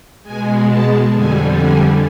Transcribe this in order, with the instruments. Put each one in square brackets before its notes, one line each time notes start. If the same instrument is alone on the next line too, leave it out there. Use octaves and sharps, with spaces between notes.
[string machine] B2 G#3 G#5
A5
F2 D3 G3 G#5
G#5